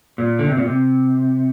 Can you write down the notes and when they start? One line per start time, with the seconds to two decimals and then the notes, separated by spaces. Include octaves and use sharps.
0.18 A#2
0.39 D3
0.48 C3
0.57 A#2
0.66 C3